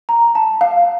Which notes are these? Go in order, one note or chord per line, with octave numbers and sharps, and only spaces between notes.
A#5
A5
F5